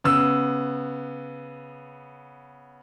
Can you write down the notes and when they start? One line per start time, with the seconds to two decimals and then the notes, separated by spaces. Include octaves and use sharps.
0.04 C#3 B3 E6